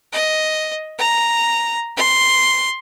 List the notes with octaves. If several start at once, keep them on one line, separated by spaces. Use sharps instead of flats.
D#5
A#5
C6